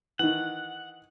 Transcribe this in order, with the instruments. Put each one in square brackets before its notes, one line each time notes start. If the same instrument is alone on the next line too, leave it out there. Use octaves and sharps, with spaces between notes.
[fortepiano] D#3 E3 [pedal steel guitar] F#5